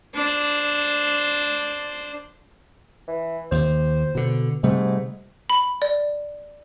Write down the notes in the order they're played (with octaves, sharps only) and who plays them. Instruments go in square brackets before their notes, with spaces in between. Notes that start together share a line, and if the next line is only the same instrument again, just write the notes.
[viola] D4 C5
[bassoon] E3
[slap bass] D#2 [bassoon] C5
[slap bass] B2 D3
[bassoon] G#2 [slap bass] C3 G3 A3
[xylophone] B5
D5